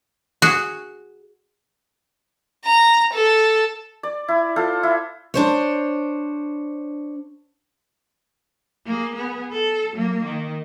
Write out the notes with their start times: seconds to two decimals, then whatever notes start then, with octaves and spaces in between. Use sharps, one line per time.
0.42 F#4 G#4
2.65 A#5
3.14 A4
4.03 D5
4.28 E4
4.56 F4 A4 C5
4.83 E4
5.34 D4 C5 C#5
8.86 A#3 G#4
9.16 B3 G#4
9.53 A4
9.92 F#3 A#3
10.24 D#3